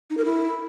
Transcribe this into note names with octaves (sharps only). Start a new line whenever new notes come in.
D#4
A#4
E4